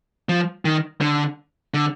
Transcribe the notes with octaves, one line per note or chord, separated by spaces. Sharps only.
F3
D#3
D3
D3